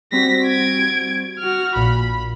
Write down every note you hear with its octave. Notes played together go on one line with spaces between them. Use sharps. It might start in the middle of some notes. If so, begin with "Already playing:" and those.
G3 C4 F#4 A#6 B6
G#6 D7
F#4 F6
A#1 A#2 B5